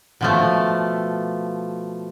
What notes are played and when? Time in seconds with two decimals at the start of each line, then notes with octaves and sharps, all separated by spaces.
0.21 B2 F3 A3